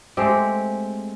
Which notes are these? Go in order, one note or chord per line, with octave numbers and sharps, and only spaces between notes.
G#3 A3 C4 G4